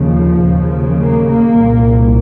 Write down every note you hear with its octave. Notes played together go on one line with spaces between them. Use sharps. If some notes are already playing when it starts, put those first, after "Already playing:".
Already playing: D#2 C#3 F3
D#2 C#3
A#3
A#3
C2 A#2